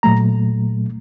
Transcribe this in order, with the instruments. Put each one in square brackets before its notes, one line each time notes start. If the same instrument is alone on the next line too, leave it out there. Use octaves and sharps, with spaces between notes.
[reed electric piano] A#2 F#3 A3 A#5